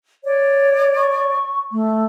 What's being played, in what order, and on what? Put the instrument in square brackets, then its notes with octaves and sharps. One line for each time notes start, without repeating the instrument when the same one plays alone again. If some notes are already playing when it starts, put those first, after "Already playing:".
[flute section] C#5 D5
[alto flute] C#6
A3